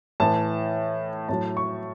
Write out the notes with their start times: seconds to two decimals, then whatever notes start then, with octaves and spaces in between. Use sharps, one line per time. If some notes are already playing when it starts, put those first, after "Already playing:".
0.20 A2 E3 A5
1.29 A2 F#3 A5
1.57 C#6